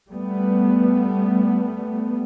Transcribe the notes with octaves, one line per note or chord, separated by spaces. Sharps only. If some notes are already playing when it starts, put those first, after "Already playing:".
G3 A3 B3